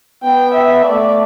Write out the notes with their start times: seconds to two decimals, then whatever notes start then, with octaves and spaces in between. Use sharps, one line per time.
0.23 B3 G5
0.54 E5
0.83 A3 D5